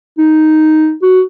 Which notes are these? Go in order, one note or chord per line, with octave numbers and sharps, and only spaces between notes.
D#4
F#4